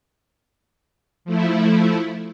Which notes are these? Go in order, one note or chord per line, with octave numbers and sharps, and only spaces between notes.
F3 A3 E4